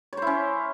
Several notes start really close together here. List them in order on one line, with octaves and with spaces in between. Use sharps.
C#5 C5 E4 C#4